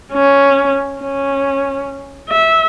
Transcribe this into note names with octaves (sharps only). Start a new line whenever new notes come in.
C#4
C#4
E5